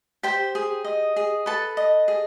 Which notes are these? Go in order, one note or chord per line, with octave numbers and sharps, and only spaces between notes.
G4 C5 G5
G#4
D#5
G#4
A4 B4 A5
D#5
G#4